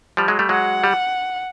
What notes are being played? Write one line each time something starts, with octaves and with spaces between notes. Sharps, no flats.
F3 G3
F#3 G#3
G3 A3
F#3 G#3 F#5
G3